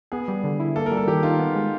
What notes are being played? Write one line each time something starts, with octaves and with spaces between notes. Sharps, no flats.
B3 G#4
G3
D3
E4
A#3 A4
A#4
G3
A4
D#3 G4
D#4 F4
B3
G#3